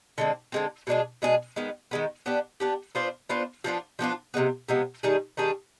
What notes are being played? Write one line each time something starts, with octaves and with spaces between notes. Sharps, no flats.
D3 G#3 C4
D3 G#3 C4
B2 G#3 D4 G#4
B2 G#3 D4 G#4
D#3 G#3 B3
D#3 G#3 B3
B3 D4 G4
B3 D4 G4
B3 D4 F4 C5
B3 D4 F4 C5
F3 B3 D4 F4
F3 B3 D4 F4
C3 F3 G#3 B3
C3 F3 G#3 B3
D#3 G3 D4 G#4
D#3 G3 D4 G#4